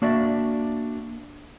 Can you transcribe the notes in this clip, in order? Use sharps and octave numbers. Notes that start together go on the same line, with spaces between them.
A#3 D4 F#4 D5 E5